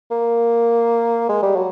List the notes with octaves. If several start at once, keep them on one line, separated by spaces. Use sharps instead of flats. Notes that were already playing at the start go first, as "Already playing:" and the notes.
A#3
G#3
G3
F#3